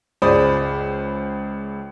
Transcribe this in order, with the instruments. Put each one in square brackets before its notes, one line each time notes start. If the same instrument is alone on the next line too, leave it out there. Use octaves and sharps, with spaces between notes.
[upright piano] C#2 G#4 C5 D5 B5 D#6